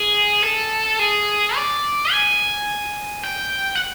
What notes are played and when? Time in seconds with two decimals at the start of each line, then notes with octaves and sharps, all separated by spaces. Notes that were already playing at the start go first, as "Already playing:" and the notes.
Already playing: G#4
0.43 A4
0.99 G#4
1.56 D5
2.12 G#5
3.23 G5
3.75 F#5